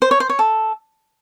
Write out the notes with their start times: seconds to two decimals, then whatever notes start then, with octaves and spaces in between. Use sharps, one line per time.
0.02 C5
0.11 C#5
0.20 C5
0.30 C#5
0.39 A4